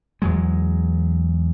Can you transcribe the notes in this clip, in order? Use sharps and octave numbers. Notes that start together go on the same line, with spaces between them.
E2 F#3 G#3